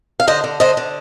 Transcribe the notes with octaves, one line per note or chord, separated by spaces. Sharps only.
F5
D3 C5 D#5
D3
D3 C5 D#5
D3